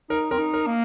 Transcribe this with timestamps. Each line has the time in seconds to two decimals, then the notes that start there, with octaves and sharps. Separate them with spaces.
0.10 D#4 A#4
0.31 C4 A#4
0.38 D#4
0.54 A#4
0.67 A#3